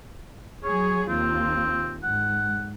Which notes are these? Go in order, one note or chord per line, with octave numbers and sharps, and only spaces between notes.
F#3 G#4 C#5
D#2 C4 F4
G#2 F#5